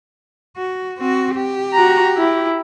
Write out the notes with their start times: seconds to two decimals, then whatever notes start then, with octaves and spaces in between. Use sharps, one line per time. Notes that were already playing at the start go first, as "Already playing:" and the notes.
0.57 F#4
0.98 C4 F#4
1.36 G4
1.73 F#4 A#5
2.17 E4